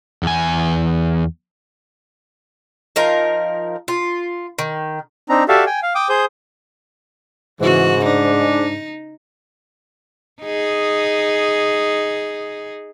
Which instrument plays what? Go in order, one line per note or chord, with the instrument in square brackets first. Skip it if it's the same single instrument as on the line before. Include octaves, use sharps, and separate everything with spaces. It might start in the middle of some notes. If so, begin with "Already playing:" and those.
[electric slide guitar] E2 G#5
[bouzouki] F3 D#4 A#4 F5
F4
D#3
[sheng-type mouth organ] C4 D4 D#4 A#5
F#4 G4 A4 D5 E5 F5
G5 G#5
F5
G5 D6 D#6
G#4 C5 D#6 G6
[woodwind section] G#2 [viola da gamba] C#3 F#4 [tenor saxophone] E3
[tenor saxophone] D4 [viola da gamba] D#4
[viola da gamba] D#4 G#4